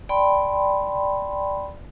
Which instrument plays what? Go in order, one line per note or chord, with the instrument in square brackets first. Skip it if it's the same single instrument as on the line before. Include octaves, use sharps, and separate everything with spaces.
[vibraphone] D5 G5 A5 B5 C6